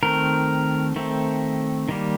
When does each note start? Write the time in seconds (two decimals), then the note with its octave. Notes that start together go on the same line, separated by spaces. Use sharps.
0.03 D#3 A3 C4 A#4
0.96 D#3 A3 C4
1.89 D#3 G3 A#3